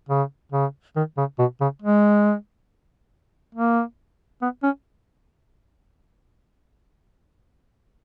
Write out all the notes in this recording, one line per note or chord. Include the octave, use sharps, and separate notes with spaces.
C#3
C#3
D#3
C#3
B2
C#3
G#3
A#3
B3
C#4